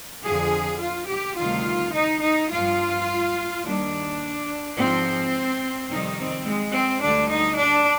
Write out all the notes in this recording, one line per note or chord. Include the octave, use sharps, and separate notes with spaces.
F2 D3 F3 G#4
F4
G4
D2 C3 D#3 G3 F4
D#4
D#4
G2 F3 F4
D#2 D#3 G3 D4
G#2 F3 C4
F2 C3 D#3 G3 D#4
C4
G#3
C4
D2 D3 G3 D4
D#4
D4